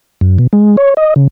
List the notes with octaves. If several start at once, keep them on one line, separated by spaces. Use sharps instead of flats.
F#2
B2
G#3
C#5
D#5
C#3